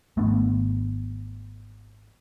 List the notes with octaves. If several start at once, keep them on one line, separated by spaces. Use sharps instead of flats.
G#1 A3 B3 D4